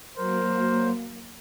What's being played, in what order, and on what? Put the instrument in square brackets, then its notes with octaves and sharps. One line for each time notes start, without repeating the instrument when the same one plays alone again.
[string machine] F#3 A#3 [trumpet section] A#4 C5